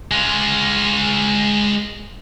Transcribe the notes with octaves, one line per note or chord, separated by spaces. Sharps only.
G#3 F4